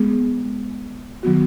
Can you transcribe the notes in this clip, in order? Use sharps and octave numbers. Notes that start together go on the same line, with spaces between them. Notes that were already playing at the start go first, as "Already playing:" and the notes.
Already playing: G#3 B3 G#4
D#3 F#3 B3 F#4